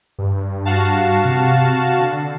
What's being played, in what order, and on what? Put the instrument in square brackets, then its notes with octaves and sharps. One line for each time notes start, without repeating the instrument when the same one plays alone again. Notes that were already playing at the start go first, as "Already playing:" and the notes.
[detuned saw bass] G2
[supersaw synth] F#4 F5 A5
[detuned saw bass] C3
D3